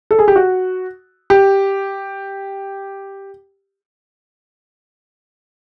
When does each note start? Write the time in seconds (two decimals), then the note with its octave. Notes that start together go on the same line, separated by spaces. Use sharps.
0.11 A4
0.19 G#4
0.28 G4
0.36 F#4
1.30 G4